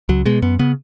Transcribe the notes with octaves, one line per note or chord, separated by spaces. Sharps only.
C#2 F#3
B2 G#3
F#2 B3
C#3 B3